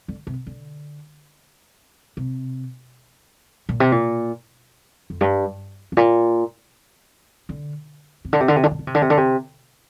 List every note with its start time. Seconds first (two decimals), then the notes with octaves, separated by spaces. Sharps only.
0.08 D3
0.27 C3
0.47 D3
2.17 C3
3.69 A#2
3.80 C3
3.92 A#2
5.10 F2
5.21 G2
5.92 G2
5.97 A#2
7.49 D3
8.25 C3
8.33 D3
8.40 C3
8.48 D3
8.56 C3
8.64 D3
8.71 C3
8.79 D3
8.87 C3
8.95 D3
9.02 C3
9.10 D3
9.17 C3